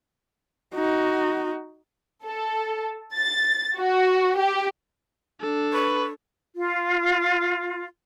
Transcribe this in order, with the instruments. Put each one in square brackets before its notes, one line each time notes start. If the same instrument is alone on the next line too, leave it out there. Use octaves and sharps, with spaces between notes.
[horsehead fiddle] D#4 F#4
[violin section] A4
A6
F#4
G4
[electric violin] D4 A4
[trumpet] B4 [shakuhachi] C#6
[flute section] F4